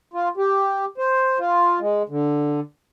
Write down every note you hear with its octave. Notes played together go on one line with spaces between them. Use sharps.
F4
G4
C5
F4
G#3
D3